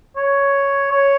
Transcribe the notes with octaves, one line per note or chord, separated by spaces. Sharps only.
C#5
C#5